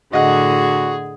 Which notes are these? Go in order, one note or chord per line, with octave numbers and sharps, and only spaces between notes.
A2 D3 F#4 G#4 D#5 F#5